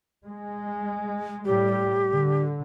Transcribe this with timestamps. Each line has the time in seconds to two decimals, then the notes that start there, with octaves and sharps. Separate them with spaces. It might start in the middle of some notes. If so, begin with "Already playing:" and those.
0.25 G#3
1.45 A2 G3 G4
2.13 D3